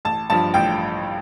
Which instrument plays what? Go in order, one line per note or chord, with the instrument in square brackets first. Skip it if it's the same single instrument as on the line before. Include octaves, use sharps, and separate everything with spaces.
[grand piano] A1 A5
G2 F3 A5
A1 G5